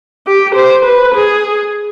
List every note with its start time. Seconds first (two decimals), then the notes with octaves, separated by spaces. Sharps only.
0.27 G4
0.56 C5
0.85 B4
1.15 G#4